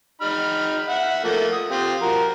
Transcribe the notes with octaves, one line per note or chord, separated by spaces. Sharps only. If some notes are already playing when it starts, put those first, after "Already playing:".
D#4 B5 F6
E5 F#5
F3 A3 A#3
D#6
C4 F4 G4
F3 F#4 A#4